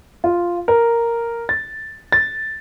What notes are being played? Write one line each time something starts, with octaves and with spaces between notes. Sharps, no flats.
F4
A#4
A6
A6